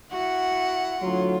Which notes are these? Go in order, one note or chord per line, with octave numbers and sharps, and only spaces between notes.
E4 F#4 F#5
A2 D3 F#3 F4